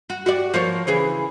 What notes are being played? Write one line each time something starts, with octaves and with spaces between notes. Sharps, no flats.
F#4
F#4 G4 D5
F3 A#3 C#5
C#3 E3 G#4